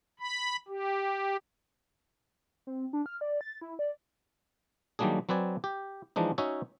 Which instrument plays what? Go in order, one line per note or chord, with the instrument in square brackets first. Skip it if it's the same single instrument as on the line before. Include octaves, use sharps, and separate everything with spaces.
[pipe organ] B5
G4
[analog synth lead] C4
D4
F6
D5
A6
E4
D5
[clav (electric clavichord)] D#3 F#3 G3 A#3 D4 G#4
F#3 C4 B4 D5 G#5
G4
E3 F3 G#3 D4 D#4
C#4 D#4 F#4 C#5 E5 F#5